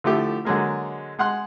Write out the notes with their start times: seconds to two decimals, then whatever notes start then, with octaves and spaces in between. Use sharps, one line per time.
0.04 D3 F3 A3 E4 G4
0.45 D3 F#3 G#3 A#3
1.19 G#3 F#5 C6 F#6